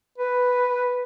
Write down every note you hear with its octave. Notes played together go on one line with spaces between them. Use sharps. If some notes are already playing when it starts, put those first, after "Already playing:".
B4